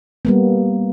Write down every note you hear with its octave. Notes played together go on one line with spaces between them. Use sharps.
G3 A#3 B3